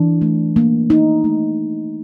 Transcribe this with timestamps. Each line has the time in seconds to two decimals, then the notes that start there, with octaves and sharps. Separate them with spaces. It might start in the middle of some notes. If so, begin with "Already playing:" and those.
Already playing: E3 D4
0.22 A3
0.56 A#3
0.90 D#4
1.24 A3